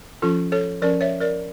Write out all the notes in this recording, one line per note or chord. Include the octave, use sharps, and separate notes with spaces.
F3 C#4 F4 A4
A4 C#5
F3 C#4 A#4 D5
C#5 E5
A#4 D5